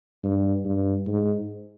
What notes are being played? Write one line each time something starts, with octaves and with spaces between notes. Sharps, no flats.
G2
G2
G#2